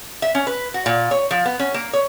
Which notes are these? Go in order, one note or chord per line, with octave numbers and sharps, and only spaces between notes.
E5
C#4
B4
F#4
A#2
C#5
F3
B3
C#4
A#3
C#5